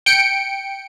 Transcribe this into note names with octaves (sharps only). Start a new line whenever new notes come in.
G5 C#7 D7